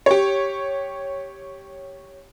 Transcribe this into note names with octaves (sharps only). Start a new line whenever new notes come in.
G4 C#5